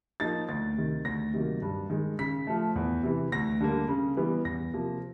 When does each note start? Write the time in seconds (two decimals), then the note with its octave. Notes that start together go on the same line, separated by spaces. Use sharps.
0.20 F3 A#3 D#4 A6
0.48 D2 A6
0.77 C3 D#3
1.05 D2 A#6
1.33 C3 D#3 F#3 A#3
1.62 G2
1.90 D#3 G#3
2.19 C#3 B6
2.47 F3 A3
2.76 E2
3.03 C3 E3
3.32 D2 A#6
3.61 D3 G3 A#3
3.88 C#3
4.17 E3 G3 B3
4.45 E2 A#6
4.74 C3 F3 A#3